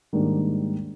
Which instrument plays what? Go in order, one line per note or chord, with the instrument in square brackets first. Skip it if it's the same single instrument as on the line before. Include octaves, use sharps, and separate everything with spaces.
[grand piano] G#2 D#3 G3 A#3 D4